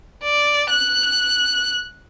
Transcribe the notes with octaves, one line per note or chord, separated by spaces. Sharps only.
D5
F#6